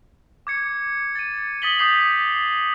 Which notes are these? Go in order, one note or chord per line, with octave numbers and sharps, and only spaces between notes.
D6 G#6 C#7
A6 D#7
D#6 A6 B6 F#7 G7
D6 D#6 G6 B6 C7 F7